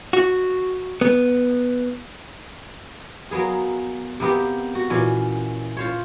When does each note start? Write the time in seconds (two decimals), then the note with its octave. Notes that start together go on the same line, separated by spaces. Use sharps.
0.13 F#4
1.01 B3
3.31 F#3 A#3 B3 G#4
4.20 C3 A#3 B3 G4
4.75 F#4
4.90 A#2 E3 C#4
5.77 F4 C5 C#5